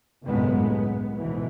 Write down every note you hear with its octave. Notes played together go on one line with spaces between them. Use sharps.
G1 C2 F#2 A2 G#3 B3
B3
D2 G#2 B2 E3